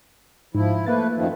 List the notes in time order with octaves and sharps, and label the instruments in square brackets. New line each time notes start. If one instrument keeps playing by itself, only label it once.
[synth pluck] G#2 [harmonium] F3 E4
[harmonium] A3 B4 [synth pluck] A#3 A6
[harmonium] F#2 D#3 F3